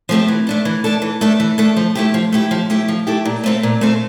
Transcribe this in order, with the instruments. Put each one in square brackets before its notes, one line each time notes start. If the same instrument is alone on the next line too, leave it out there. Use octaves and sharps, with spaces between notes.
[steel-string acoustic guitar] F3 A3 C4 G4
E3
A3 D4 A4
E3
A3 D4 A4
E3
A3 D4 A4
E3
A3 D4 A4
F3
A3 E4 G4
F3
A3 E4 G4
F3
A3 E4 G4
F3
A3 E4 G4
A#2
A3 C4 F4 A4
A#2
A3 C4 F4 A4